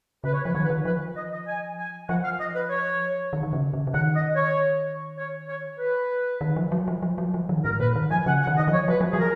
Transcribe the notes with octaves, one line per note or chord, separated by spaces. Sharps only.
C#3 B4
C#5
F3 B4
D#3 C#5
B4
D#3
F3 B4
D#5
D#5
G#5
G#5
F3 F#5
F5
D#5
B4
C#5
D#3
D#3
C#3
C#3
C#3
D#3 F#5
D#5
C#5
C#5
C#5
B4
D#3
F3
F#3
F3
F3
F#3
F3
D#3
G#2 A#4
A#2 B4
D#3
F3 G#5
C#3 F#5
F#5
D#3
D#3 D#5
F3
C#5
F#3 B4
F3
F#3 G#4
A#4